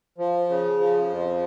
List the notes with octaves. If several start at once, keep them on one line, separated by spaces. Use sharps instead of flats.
F3
C#3
F3
F2